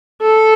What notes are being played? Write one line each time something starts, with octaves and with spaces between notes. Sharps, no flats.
A4